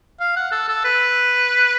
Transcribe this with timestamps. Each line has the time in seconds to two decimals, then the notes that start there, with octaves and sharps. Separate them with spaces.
0.20 F5
0.36 F#5
0.52 A4
0.68 A4
0.85 B4